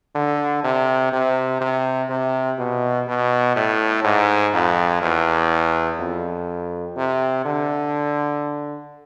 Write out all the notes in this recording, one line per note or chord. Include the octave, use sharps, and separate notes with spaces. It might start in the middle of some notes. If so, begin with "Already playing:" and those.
D3
C3
C3
C3
C3
B2
B2
A2
G#2
F2
E2
F2
C3
D3